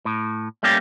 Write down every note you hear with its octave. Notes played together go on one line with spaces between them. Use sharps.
A2
G3 A3 A#3 C#4 G4